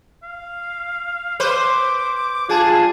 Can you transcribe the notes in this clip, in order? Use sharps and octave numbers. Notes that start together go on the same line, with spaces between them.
F5
B4 C5 D6
G3 D4 F4 G#4 G#5 A5